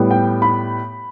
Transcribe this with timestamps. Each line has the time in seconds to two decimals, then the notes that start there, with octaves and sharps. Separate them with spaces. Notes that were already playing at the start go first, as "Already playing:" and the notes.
Already playing: A2 G3 B3
0.11 G5
0.42 B5